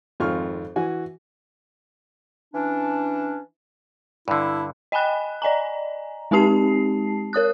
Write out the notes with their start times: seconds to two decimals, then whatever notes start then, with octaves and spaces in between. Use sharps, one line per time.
0.20 G#1 F2 D#3 F4 C#6 F6
0.76 E3 F#4 G#5
2.54 E3 C#4 D4
4.28 G2 D3 E4
4.92 D#5 G5 G#5 B5 F#6
5.42 D5 D#5 G#5 A#5
6.31 G#3 C4 D#4 G4 A5 C7
7.33 A#4 C#5 D#6 F#6